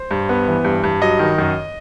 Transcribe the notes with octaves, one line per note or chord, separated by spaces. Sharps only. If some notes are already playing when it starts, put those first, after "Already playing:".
Already playing: C5
G2
B3
E3
G2
G2
F#3 D#5
D#3
F#2